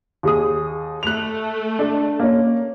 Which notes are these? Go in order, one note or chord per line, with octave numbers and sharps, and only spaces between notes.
D#2 G#4 D#6
A3 F#6 F7
D4
A#3 C#4